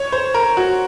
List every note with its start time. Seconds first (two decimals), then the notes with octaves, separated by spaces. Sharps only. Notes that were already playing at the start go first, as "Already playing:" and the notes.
Already playing: C#5
0.12 C5
0.34 A#4
0.57 F#4